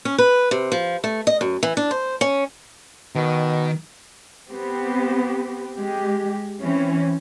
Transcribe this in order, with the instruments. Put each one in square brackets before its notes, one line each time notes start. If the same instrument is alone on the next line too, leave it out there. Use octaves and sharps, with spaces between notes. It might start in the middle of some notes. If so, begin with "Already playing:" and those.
[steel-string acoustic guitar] C#4
B4
C3
F3
A3
D#5
F#2
E3
D4
C5
C#4
[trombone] B2 [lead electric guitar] D#3
[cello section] B3 C4 G4
G#3 G4
E3 C4 C#4